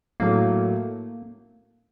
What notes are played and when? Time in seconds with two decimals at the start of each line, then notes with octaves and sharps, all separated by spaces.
0.20 A2 F#3 A3 A#3